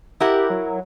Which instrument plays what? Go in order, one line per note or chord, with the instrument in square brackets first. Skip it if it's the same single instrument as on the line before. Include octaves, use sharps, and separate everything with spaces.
[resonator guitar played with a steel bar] E4 A#4 F#5 [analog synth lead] G4
[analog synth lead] F#3